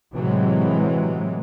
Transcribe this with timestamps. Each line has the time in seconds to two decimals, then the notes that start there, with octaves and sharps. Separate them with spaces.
0.14 A2 C3 E3 F#3 G#3